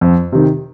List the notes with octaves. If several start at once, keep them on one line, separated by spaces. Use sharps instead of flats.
F2
C3 D#3